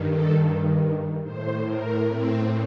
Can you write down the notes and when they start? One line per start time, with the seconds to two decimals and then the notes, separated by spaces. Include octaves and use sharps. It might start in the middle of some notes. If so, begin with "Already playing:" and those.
Already playing: G2 D#3
0.11 A4
1.23 A2 C5
1.65 A#4
2.08 C4